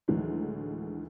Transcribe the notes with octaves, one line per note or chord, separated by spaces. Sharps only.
D2 A2 D#3 E3 F#3 G#3